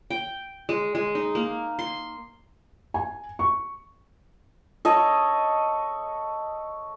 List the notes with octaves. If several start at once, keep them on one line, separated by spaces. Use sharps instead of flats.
G5
G#3
G#3
D#4
A#3
C6
G#5
C#6
A4 C#5 D#5